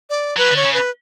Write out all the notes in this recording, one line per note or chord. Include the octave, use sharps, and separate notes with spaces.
D5
F#3 B4
D3
C#5
C#3
B4